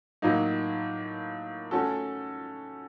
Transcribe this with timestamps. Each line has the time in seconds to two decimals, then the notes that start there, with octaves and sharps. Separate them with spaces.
0.22 A2 F#3 A#3 D#4
1.71 A3 C#4 F#4 A4